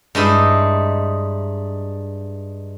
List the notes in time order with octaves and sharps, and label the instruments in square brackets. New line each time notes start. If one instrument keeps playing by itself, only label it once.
[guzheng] G2 G#3 D#4 E4